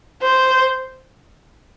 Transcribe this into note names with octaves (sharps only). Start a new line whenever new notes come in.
C5